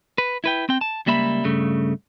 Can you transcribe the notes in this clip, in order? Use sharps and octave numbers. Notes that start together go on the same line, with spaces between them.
B4
E4 B4 G5
C4 G5
A5
C#2 G3 A#3 E5 B5
G2 C#3 A3